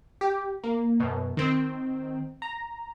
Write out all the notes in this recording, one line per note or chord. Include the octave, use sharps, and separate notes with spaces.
G4
A#3
F#2 B2
D#3 C4
A#5